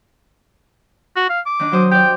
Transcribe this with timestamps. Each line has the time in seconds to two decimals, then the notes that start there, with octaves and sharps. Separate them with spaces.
1.16 F#4
1.30 F5
1.46 D6
1.59 D#3 D4
1.72 F#3 C5 D#6
1.91 G4 D5 G5